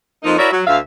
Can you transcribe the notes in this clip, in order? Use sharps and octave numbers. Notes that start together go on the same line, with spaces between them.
F2 F3 A#3 D#4
E4 F#4 A#4 C#5 D5 E5
F#3
D2 E5 F5